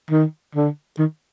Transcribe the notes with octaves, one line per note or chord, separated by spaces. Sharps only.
D#3
D3
D#3